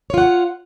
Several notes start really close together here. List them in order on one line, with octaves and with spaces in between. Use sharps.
C#5 F4 F#5